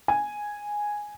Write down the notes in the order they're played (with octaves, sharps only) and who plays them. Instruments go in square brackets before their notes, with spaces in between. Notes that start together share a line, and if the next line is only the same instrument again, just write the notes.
[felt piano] G#5